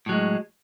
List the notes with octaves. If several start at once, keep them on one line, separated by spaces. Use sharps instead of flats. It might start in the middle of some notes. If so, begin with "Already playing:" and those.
A2 F#3 G#3